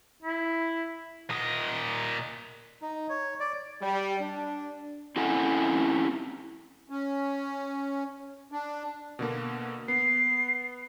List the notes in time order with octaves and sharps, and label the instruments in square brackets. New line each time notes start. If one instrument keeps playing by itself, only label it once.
[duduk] E4
[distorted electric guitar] A#2 D#5
[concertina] D#4
C#5
D5
[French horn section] G3
D4
[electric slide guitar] C4 C#4 E4 A4 F#5 G#5
[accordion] C#4
D4
[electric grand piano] B2 D3 A#3
[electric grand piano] B3 [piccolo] C7